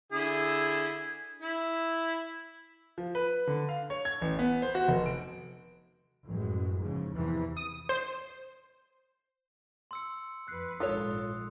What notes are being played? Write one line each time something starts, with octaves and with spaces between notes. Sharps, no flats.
D3 E4 G#4
E4
F3
B4
D3
F5
C#5
G#6
A1
B3
C5
F#4
F1
D7
A1 F#2 G#3
G#2 C#3 F3
E2 C3 E3 F3
D#6
C5
C6 E6 C#7
F2 B4 C6 F#6 C7
A#1 G#2 F4 A4 C#5 D#6 F#6